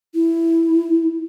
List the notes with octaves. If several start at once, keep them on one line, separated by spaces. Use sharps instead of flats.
E4